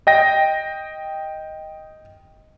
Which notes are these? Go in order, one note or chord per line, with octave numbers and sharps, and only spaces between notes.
D#5 G5 A#6